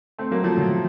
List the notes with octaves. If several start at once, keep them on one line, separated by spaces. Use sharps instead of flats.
A3 C4
F#3 A#3
F3 A3
D#3 F#3